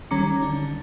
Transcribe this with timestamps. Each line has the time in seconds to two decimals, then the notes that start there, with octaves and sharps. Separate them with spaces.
0.11 D#3 G3 C#4 A#5 D6 C#7
0.43 D3 D4